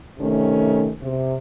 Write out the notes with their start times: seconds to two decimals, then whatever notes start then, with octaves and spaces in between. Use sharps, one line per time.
0.19 C3 D#3 A3 C#4
1.01 C3